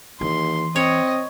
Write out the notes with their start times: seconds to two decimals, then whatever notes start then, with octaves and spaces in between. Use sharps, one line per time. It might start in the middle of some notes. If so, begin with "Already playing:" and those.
0.21 D#2 E3 C6
0.76 C4 C#5 D#5